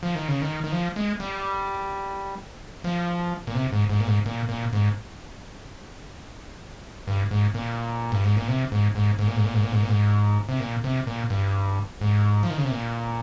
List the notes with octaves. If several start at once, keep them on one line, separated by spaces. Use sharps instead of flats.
F3
D#3
C#3
D#3
D#3
F3
G#3
G3
F3
A#2
C3
G#2
G#2
A#2
G#2
A#2
A#2
G#2
G2
G#2
A#2
G2
G#2
A#2
C3
G#2
G#2
G#2
A#2
G#2
A#2
G#2
A#2
G#2
A#2
G#2
C3
A#2
C3
A#2
G2
G#2
F3
D#3
C#3
C3
A#2